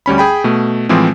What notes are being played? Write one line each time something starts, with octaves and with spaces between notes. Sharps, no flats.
D2 G3 C#4 B5
G#4 G5 B5
B2 A3
A2 E3 F3 G#3 C4